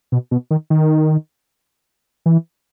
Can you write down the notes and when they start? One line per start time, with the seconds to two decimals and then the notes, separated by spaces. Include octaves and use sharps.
0.12 B2
0.31 B2
0.51 D#3
0.70 D#3
2.26 E3